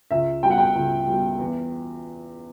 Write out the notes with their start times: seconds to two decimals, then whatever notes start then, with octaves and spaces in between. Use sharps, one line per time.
0.11 C#2 E5
0.43 B2 G3 G5
0.51 F#5
0.58 G5
0.75 C#2
1.07 B2 G3
1.39 E2